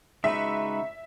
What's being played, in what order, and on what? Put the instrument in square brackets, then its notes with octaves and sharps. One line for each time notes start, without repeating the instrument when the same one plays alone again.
[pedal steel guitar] C#3 G#3 D#4 F#4 B4 [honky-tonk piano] E5